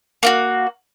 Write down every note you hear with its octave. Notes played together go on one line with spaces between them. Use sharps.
A#3 F4 F#4